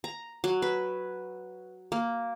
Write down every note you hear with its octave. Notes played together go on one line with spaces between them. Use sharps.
A#5
F#3
B4
A#3